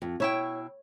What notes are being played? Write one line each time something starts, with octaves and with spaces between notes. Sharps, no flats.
F2
B2 E4 C#5 G5